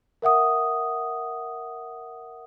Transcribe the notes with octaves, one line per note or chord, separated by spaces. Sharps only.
A#4 E5 F#5 D#6